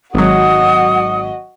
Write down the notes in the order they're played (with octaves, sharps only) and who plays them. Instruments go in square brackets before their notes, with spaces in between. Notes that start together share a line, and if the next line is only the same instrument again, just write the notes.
[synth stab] G#1 F#3 [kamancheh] F#4 D#5 [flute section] F#5 D#6